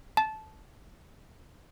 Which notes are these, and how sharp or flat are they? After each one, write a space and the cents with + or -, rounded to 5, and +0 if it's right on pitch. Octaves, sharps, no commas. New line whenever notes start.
A5 -15